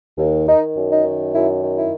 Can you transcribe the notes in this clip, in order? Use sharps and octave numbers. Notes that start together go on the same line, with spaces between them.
D#2
D#3 D#4
F#2
D#4
D#3
F#2 E4
D#3
E4